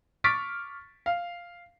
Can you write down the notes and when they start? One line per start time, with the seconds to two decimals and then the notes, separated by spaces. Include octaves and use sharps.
0.24 C#6 D6 F6 A6 B6 D7
1.06 F5